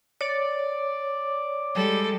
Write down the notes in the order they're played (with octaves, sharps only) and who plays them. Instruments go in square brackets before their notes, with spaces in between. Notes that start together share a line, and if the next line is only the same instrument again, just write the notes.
[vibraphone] C#5 [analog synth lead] D5
[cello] G3 G#3 [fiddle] A4